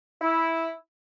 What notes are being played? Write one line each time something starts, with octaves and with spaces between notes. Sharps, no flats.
E4